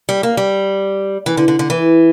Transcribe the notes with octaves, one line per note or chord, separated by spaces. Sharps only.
G3
A#3
G3
E3
D3
D3
D3
E3